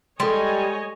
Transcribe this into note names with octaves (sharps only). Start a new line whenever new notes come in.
G3 G#3 A4 C#5 D#5 G#5 C6